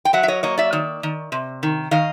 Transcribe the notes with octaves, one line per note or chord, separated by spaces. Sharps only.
G5
F#3 E5 F#5
E5
C#5 D#5
A#3 C#5 D#5
D5 E5
D#3
D#3
C3
D#3
D#3 D#5 F5